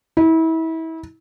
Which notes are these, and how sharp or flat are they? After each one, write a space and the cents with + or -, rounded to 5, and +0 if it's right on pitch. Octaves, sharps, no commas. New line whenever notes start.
E4 -30